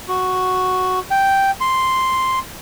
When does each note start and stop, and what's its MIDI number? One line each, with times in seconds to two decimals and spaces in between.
0.08 1.00 66
1.11 1.51 79
1.61 2.39 84